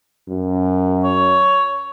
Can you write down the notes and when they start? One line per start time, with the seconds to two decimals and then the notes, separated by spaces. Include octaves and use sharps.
0.28 F#2
1.04 C#5